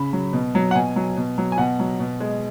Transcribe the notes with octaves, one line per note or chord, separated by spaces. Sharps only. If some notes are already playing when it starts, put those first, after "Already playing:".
Already playing: C#3 B5
F#3
B2
F#3
F#5
B2 G#5
F#3
B2
F#3
G#5
B2 F#5
F#3
B2
G#3